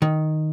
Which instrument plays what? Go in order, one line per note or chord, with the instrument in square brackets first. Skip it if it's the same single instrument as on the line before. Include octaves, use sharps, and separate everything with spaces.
[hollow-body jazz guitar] D#3